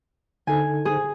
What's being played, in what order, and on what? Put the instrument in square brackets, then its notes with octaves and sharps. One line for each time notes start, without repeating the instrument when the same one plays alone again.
[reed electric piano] D3 D#4 A4 [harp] G#5
[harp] G#4